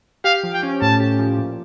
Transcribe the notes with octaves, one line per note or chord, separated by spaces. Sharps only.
G4 F5
F3
G5
C#4
A2 A5
G4
F3
A#2